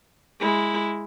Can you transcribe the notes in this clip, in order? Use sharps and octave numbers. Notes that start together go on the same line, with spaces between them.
G#3 E4